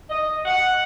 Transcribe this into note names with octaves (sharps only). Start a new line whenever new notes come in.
D#5
F#5